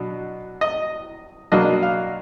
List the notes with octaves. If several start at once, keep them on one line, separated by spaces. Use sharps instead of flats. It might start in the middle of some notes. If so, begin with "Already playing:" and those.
Already playing: B2 F#3 D4
D#5
B2 F#3 A#3 D4 D#5
F5